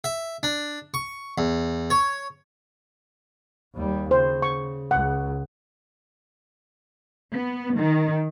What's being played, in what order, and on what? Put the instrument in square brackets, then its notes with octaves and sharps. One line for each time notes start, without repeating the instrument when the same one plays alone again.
[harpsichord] E5
D4
C#6
E2
C#5
[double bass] D#2 G3
[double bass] C#3 [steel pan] C5
[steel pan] C#6
[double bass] C#2 [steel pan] F#5
[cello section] B3
D#3